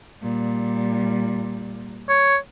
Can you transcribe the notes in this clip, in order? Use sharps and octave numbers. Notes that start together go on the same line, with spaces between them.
A#2 G3
C#5